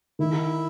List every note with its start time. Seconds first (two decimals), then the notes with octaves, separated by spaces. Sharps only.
0.19 D#3 E4